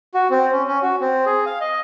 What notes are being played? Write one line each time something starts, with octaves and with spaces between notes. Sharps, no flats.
F#4
C4
C#4
C#4
F#4
C4
G#4
F5
D#5